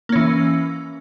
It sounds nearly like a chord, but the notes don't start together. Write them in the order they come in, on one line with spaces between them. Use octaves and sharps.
A#3 C#4 E3